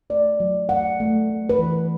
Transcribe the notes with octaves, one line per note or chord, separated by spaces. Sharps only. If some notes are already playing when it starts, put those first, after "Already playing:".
A3 D5
F#3
A3 F#5
A3
A3
B4
E3